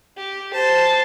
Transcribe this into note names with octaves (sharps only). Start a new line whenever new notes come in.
G4
C5 A5